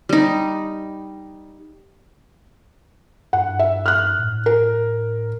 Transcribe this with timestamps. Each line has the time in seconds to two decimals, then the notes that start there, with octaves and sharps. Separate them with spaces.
0.09 G3 D#4
3.33 G2 F#5
3.59 E5
3.86 F6 F#6
4.19 A2
4.46 A#4